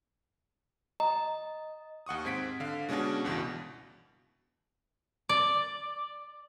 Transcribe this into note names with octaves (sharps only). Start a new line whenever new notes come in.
D#5 A#5
D#2 F#5 C#6 D#6
G#2 C4 G#6 B6 D7
D3 F5
B2 G#3 C#4 D4 F#4
G1 C#2 B2 E3
D5